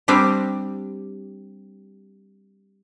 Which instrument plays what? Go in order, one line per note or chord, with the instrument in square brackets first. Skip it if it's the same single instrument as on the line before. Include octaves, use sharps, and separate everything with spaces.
[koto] G3 C4 D4 G4